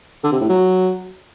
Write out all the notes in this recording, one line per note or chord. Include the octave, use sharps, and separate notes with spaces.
D3
C3
A2
F#3